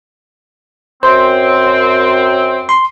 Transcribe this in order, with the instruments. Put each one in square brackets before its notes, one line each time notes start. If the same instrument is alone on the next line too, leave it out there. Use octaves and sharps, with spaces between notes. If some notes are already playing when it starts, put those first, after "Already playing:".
[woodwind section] F#2 C4 [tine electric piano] C5
[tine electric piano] C6